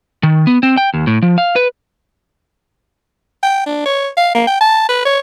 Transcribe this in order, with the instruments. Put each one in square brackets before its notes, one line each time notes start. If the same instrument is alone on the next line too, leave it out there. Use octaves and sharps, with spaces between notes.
[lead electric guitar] D#3
B3
C4
G5
D#2
A2
F3
F5
B4
[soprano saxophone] G5
D4
C#5
F5
A#3
G5
A5
B4
C#5